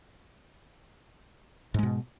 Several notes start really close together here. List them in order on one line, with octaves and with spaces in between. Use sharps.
G#2 G#3 B2